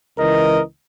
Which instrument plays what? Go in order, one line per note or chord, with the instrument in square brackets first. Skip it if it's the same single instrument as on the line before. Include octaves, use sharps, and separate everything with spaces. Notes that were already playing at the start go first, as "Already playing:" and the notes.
[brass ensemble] C#2 E3 A#4 D#5